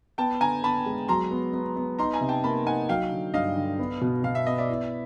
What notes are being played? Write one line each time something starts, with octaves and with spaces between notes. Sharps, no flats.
B3 G5 A5
D3 G#5 A#5
B3 A5 B5
G#3
F#3 A#5 C6
B3
B3
B3
D#4 A#5 C6
G#5 A#5
C3
G5 A5
A#3 A5 B5
D#4 F#5 G#5
F#3 F5 G5
D3
G2 D#5 F5
D3
B3
B2
B2 F5
E5
B3 D#5
D5 E5
E4